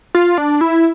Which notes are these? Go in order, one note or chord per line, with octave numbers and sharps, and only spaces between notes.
F4
D4
E4